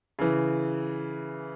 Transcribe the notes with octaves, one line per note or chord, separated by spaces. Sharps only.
C#3 E3